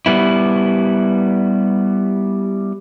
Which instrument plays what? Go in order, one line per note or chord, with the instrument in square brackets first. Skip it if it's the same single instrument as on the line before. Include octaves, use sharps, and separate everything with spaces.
[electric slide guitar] G3 B3 E4